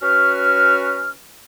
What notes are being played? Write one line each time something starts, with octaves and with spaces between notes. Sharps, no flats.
C#4 F#4 B4 F6